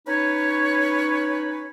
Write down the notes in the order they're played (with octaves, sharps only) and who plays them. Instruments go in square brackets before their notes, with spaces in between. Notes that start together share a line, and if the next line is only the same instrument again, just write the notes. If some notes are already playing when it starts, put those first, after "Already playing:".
[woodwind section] C#4 D#4 B4 C#5